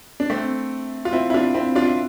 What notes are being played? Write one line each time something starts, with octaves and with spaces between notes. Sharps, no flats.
D4
A3 C4
F4
C4 E4
E4
D4 F4
C4 E4
D4 F4
E4